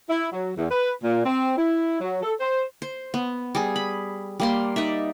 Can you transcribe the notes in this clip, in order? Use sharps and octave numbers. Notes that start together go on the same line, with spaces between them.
E4
F#3
E2
B4
A#2
C4
E4
F#3
A4
C5
C5
B3
G3 G#4
B5
G3 A#3 C6
D#4 D5 E5